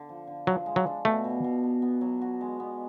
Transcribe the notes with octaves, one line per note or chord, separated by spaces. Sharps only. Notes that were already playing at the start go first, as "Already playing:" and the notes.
Already playing: D3
F3
D3
F3 F#3
G#3
F#3
D4
B2 A3
B2
B2
B3
B3
F#3
F#4
G#3
B3